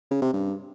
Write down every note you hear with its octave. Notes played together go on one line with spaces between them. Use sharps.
C#3
C3
G2